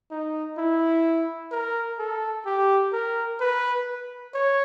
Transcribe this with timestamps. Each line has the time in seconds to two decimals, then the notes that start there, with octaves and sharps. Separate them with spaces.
0.11 D#4
0.58 E4
1.52 A#4
1.99 A4
2.46 G4
2.93 A#4
3.40 B4
4.34 C#5